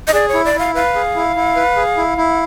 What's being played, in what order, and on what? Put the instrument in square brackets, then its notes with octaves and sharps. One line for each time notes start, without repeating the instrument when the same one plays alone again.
[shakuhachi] D#5
[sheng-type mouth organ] G#4 [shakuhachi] D5
[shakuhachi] C#5
[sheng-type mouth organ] E4
[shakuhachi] D5
[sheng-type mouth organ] E4 [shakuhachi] F5
[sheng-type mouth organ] B4 [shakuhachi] F5
[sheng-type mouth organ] G#4
E4
E4
B4
G#4
E4
E4